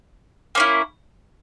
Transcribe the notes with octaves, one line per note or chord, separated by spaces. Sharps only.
A#3 C#4 E4